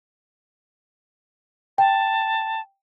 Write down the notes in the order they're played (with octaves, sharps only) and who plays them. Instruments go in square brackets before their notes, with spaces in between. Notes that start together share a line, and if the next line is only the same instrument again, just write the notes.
[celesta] G5 [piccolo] A5